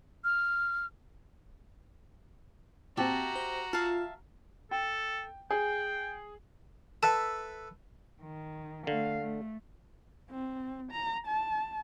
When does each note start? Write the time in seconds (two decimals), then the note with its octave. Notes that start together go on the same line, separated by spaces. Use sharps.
0.24 F6
2.97 A#2 C4 F#4 G4 E5 A5 A#5
3.36 C5
3.73 F4 E5 F5 A5 F6
4.71 A4 G5
5.50 G#4 G5
7.03 A4 B4 E5 A5
8.22 D#3
8.87 D3 A3 F5
9.22 A3
10.30 C4
10.92 A#5
11.27 A5